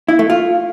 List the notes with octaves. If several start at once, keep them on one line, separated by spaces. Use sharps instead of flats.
E4
A3
F4